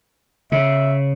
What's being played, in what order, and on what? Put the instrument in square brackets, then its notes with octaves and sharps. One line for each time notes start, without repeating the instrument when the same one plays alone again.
[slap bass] C#3 [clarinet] E5